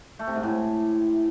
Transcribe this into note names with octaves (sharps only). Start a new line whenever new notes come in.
A3
C3
G#2
A2